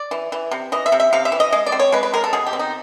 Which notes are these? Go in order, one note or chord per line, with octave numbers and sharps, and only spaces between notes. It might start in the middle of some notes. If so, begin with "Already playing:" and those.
Already playing: D5
E3
E3
C3
E3 D#5
E5
C3
E5
C3 F5
E5
E3
D#5
G#3 D#5
D5
C4
C#5
G#3 B4
B4
G#3 A#4
A4
B2 G#4
G4
C4
D#4